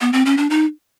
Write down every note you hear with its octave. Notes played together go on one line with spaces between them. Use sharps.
B3
C4
C#4
D4
D#4